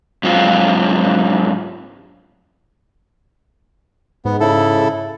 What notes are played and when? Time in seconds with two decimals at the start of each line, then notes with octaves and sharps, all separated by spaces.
0.23 G#2 F#3 C4 F4
4.25 G#2 B3
4.40 C#3 E4 A4